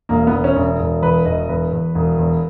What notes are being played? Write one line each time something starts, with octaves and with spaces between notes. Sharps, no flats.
E1 A#3
B3
E1
C#4
E1
E1
E2 B4
E1 D#5
E2 B4
E2
E1
E2